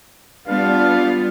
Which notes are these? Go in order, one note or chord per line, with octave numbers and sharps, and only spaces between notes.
G3 B3 D4 F4 F5